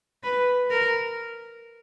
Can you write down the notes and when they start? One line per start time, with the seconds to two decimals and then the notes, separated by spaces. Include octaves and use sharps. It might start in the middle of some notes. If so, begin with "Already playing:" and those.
0.24 B4
0.71 A#4